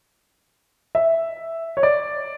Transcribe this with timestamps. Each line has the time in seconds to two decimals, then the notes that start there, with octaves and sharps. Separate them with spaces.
0.95 E5
1.77 C#5
1.83 D5